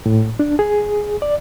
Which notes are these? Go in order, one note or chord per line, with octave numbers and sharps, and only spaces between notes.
A2
D4
G#4
D5